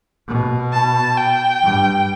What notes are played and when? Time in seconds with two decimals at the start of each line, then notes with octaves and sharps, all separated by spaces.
0.28 B2
0.73 A5
1.18 G5
1.63 G2